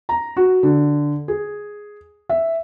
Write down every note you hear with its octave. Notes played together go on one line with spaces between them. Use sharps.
A#5
F#4
D3
G#4
E5